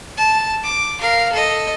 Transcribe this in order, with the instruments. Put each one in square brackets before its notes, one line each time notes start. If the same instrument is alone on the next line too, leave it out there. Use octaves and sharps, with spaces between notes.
[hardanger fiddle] A5
D6
A#4 F5
A4 D#5